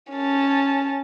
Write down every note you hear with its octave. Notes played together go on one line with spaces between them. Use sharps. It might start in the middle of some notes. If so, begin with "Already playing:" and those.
C#4 A5